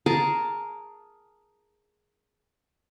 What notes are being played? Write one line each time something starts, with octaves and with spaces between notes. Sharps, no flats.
G#4 A#4 A5